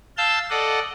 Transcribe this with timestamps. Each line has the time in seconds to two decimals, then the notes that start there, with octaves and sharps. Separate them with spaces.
0.17 F5 A5 E6 G6
0.50 A4 D5 D#5 F#5